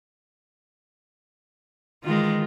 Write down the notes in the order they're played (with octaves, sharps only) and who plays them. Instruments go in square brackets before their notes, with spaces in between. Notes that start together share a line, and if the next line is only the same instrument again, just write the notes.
[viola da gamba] D#3 E3 G#3 [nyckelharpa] F4